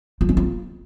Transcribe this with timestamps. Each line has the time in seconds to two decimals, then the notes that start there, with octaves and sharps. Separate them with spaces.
0.21 F4
0.29 C#4
0.37 F4